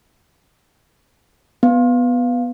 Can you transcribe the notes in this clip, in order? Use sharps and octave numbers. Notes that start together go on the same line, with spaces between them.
B3